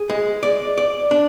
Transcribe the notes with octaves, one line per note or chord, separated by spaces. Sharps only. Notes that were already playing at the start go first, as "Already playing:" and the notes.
Already playing: G#4
G#3
D5
D5
D4